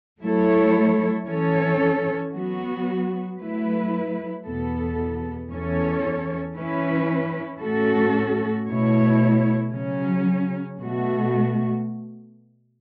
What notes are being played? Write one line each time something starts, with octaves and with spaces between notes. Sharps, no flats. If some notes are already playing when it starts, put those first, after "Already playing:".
F#3 A3 E4 A4 C#5
E3 C#4 A4 C#5
F#3 B3 F#4
F#3 A3 E4 B4
E2 B2 B3 A4
E2 E3 C#4 A4 C#5
E3 C#4 E4 B4
A2 A3 C#4 F#4 A4
B2 A3 E4 C#5
C#3 F#3 C#4
B2 A3 F#4